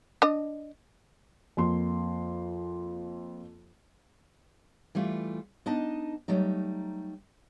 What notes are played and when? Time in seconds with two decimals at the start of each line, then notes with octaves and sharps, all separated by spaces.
0.22 D4 D#5
1.57 F2 A#3 C6
4.95 E3 G3 A3 F4
5.66 B3 D4 D#4 D#5 A5
6.28 F#3 G3 A3 D#4